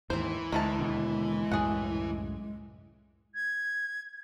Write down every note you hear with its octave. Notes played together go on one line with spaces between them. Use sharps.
D#2 G#2 E3 C4 C5
D2 D#3 G#3 E4 A5
D#2 B2 D3
C2 F#2 A2 G#4 F#5
G#6